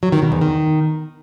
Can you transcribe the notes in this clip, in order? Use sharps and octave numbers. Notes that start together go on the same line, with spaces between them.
F#3
D#3
B2
E2
D#3